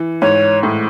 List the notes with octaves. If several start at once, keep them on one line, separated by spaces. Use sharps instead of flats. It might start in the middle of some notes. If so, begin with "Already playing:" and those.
Already playing: E3
G#2 C#5
A2